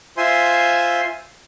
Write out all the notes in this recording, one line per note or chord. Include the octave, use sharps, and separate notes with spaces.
F4 C5 E5 G#5 C6